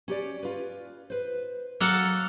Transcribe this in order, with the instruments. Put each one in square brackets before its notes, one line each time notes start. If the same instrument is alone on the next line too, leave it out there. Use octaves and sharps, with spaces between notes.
[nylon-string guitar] C#4 G4 D5
F4 B4
B4 C5
[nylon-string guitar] F#3 [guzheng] A#3 A4 F#5